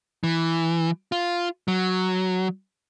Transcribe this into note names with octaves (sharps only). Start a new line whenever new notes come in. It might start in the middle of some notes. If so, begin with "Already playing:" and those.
E3
F4
F#3